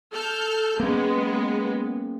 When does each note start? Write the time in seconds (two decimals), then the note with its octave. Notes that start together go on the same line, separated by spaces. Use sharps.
0.12 A4 F6 G6
0.80 G#3 A#3 B3 C#4